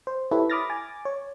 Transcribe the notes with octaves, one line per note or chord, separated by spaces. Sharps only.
C5
E4 G4 A4 B4 C#5 E5
B5 D6 D#6 F6 A6 A#6
G#5 D6 A6
C#5